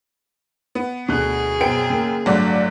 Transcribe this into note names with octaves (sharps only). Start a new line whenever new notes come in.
B3
D2 B2 G#4 F#6
F#2 B2 C5 G5 D7
C#3 A#3
G1 A2 D3 F#3 D5